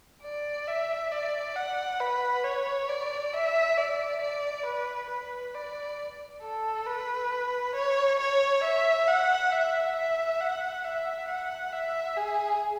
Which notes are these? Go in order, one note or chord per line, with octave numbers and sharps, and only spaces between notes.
D5
E5
D5
F#5
B4
C#5
D5
E5
D5
D5
B4
B4
D5
A4
B4
C#5
C#5
E5
F#5
E5
E5
F#5
E5
F#5
E5
G#4